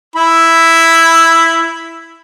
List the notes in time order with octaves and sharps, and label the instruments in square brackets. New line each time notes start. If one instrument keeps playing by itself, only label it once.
[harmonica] E4 B5